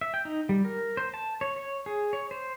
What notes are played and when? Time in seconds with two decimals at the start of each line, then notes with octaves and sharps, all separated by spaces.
0.01 E5
0.14 G5
0.25 D#4
0.49 G3
0.65 A#4
0.97 C5
1.14 A5
1.41 C#5
1.56 C#5
1.86 G#4
2.13 C#5
2.31 C5